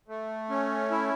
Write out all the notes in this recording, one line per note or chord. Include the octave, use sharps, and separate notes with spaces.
A3
C#4
E4